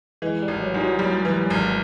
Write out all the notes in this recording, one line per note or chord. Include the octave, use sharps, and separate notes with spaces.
E3 G#3
G3
G#1
F#3
G#2 G3
F#3
F#3 G3
E3
G#1